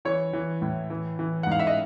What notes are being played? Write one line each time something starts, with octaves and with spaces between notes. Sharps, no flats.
E3 C#5
E3
A2
E3
E3
F#5
G#2 F5
E5
D#5